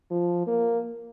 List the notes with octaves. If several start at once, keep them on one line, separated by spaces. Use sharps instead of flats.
F3
A#3